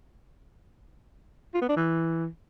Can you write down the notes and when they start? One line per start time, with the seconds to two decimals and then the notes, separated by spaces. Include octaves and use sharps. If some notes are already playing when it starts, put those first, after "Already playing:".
1.54 F4
1.62 B3
1.69 D4
1.76 E3